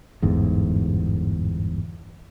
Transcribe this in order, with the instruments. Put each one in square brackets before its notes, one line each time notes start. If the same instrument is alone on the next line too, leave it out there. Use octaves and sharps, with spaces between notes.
[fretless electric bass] G1 E2 G#2